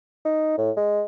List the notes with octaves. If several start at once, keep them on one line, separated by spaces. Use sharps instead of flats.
D#4
A2
G#3